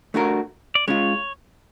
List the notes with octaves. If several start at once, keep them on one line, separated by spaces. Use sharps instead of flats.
A3 D4 F#4 A#4
D5
G#3 C#4 F4 C#5